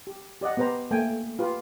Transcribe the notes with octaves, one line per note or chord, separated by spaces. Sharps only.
G4
G4 D5 D#5 F#5
B3 G4 B4 C5 A#5
A3 A#3 G5 G#5
F4 G4 B4